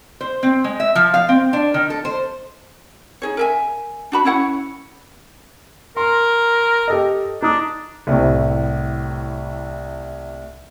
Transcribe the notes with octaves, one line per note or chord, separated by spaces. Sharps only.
C5
C4
G#3
E5
F3
F5
C4
D4
D#3
A4
C5
D#4 G#4 C#5
A#4 E5 G#5
D4 F#4 B5
C#4 E4 C#5 F#5
A#4 C6
G4 A4 D#5
D4 D#4 D#6
C2 A2 C3